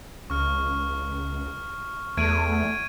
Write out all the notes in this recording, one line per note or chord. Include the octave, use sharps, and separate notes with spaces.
C#2 C#6 F6
E2 A3 G#6 D7 D#7